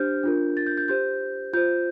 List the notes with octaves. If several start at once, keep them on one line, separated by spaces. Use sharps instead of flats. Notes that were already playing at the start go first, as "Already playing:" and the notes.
Already playing: D4 G4 C5 F6 G6
D4 F4 A#4
A6
G6
G6
G4 C5 G6
F4 C5 G6